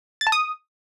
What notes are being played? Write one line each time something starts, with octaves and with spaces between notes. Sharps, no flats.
A6
A5
D#6